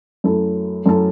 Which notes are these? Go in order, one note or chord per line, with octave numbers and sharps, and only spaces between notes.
F#2 F#3 A3 E4 A4
F#2 F#3 A3 E4 A4